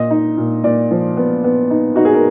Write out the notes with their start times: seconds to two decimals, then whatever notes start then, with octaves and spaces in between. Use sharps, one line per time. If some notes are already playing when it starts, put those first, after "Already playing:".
Already playing: A#2 D#5
0.11 D#4
0.37 A#2
0.64 A#2 D5
0.91 F3
1.17 B3
1.44 B3
1.70 D#4
1.96 D#4 F#4
2.05 G#4
2.14 A#4